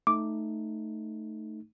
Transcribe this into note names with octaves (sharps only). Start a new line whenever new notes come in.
A3 D#4 D6